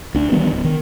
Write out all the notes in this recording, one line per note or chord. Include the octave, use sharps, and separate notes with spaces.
D2 D4
D#3 E3 G3 B3
D1
D#3